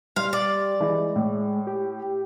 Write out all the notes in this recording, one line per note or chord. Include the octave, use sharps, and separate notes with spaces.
G3 F5 C6
D5
E3 G#3
A2
G4